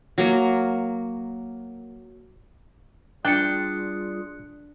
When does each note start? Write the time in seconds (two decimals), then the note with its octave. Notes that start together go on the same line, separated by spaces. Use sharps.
0.18 F#3 A#3
3.25 G3 D4 F4 G#4 G5 F#6 C#7